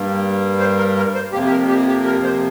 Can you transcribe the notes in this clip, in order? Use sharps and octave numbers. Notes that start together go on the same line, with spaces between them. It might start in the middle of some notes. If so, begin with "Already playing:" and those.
Already playing: G2 G3 A#3
C5
A#4
A#4
C5
F2 C3 A#3 G4
G4
A#4
G4
G4
A#4
C5